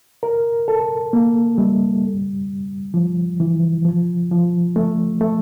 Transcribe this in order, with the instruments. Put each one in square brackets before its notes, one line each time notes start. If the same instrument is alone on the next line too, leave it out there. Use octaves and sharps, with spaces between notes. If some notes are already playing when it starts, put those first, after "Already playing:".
[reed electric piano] A#4
A4
A#3
G3
F3
E3
F3
F3
A3
A3